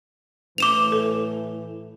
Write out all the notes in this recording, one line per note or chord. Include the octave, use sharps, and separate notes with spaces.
A2 E3 D6 E7 F7
A4